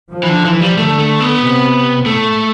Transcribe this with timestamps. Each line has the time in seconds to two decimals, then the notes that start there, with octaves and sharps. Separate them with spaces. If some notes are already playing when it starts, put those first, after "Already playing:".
0.12 F3
0.24 E3
0.29 D3
0.45 E3
0.61 G3
0.77 D3 A3
0.99 A3
1.20 B3
1.41 C3
2.06 A2 A3